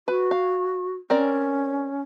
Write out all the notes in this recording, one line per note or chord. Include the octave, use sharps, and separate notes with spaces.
F#4 B4
F5
C4 C#4 A#4 D5